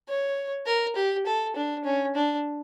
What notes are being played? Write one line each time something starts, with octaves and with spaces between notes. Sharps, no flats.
C#5
A#4
G4
A4
D4
C#4
D4